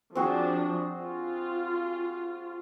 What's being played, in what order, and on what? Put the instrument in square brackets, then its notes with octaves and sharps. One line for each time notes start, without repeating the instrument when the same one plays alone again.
[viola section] F3 D4 [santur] C4 F#4 G#4
[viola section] F4